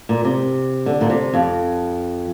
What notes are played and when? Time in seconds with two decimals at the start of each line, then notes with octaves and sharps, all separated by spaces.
0.09 A#2
0.25 C3
0.86 D3
1.01 A#2
1.10 C3
1.34 F2